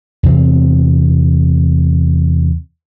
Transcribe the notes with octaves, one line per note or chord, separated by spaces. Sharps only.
E2 C3 C4